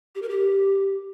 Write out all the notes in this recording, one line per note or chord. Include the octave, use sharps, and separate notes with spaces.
G4
A#4
G4